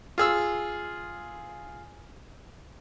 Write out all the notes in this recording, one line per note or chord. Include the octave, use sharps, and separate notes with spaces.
F4 G#4 E6